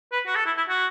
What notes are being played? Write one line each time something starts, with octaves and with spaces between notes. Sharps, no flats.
B4
F#4
A4
E4
E4
F#4